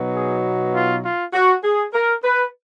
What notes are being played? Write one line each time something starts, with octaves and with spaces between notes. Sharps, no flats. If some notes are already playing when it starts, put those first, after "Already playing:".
Already playing: B2 F#3 B3 D#4
G#4
F4
F4
F#4
G#4
A#4
B4